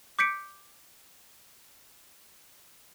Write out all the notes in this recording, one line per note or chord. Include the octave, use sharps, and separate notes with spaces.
D6 G6 B6 C#7 D7